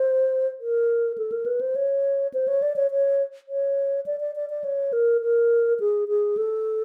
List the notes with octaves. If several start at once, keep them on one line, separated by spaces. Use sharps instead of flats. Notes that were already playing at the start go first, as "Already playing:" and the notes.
Already playing: C5
A#4
A4
A#4
B4
C5
C#5
C5
C#5
D5
C#5
C#5
C#5
D5
D5
D5
D5
C#5
A#4
A#4
G#4
G#4
A4